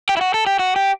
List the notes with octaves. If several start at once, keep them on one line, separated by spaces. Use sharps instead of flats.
G4
E4
F#4
A4
G4
F#4
G4